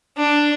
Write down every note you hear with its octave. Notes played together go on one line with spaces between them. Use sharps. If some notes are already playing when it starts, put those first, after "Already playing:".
D4